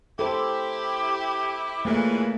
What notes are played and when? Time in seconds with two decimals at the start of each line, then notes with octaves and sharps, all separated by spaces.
0.19 E4 G4 A4 C5
1.85 A#2 C#3 E3 A3 A#3